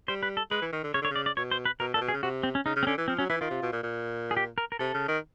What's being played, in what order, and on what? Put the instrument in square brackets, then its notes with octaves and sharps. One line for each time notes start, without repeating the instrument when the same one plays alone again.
[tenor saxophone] G3 [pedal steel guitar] C5
[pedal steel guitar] B4
A4
[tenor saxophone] G#3 [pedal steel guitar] B4
[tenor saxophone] E3
D#3
D3
[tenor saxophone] C#3 [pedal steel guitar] C#5
[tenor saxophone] D3
[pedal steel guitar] C#5
[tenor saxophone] C#3
[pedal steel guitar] D5
D5
[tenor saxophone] B2 [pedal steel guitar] C#5
[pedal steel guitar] C5
B4
[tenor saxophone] B2 [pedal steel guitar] A#4
[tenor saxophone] A#2 [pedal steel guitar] A4
[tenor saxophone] B2
[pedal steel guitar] G#4
[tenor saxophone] C#3
[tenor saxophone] C3 [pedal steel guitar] F#4
[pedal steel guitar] C4
C#4
[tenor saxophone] C#3 [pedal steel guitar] D#4
[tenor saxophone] C#3
[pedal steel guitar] C4
[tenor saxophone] D3 [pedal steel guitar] C#4
[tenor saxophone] E3
[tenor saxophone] F3 [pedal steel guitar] C4
[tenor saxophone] F#3 [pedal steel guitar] C#4
[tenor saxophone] E3 [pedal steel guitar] E4
[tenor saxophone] D#3 [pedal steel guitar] F4
[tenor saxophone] C3
B2
A#2
A#2
[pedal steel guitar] G#4
G4
A#4
A#4
[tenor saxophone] C3 [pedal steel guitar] A4
[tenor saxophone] C#3
D#3